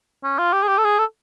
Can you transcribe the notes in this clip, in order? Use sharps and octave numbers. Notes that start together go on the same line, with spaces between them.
C#4
F4
G4
G#4
G4
A4
G#4
A4